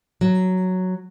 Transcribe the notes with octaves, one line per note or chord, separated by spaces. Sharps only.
F#3